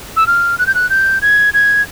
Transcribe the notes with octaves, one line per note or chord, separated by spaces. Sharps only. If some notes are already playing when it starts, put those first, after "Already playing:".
E6
F6
F#6
G6
F#6
G6
G#6
G#6